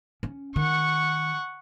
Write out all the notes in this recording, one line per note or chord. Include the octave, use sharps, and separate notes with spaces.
C#4
D#3 F#5 C#6